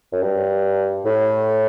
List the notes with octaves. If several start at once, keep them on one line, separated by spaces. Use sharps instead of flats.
F#2
G2
A2